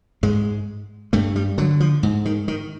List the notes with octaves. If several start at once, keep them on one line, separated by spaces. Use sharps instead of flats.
G#2 G#3
G2 A3
G3
D3 F#3
F3
G#2
D#3
D#3